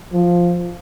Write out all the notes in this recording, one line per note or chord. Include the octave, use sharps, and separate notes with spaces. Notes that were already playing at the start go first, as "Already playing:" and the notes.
F3